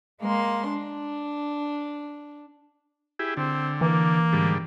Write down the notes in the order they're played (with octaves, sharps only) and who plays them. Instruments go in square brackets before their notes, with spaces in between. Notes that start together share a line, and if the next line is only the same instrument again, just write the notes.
[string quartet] G#3 A#3 C6
D4
[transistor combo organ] E4 G4 G#4
[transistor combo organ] D3 [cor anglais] C4
[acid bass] E3 [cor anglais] A#3
[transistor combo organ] G#2 D3 G3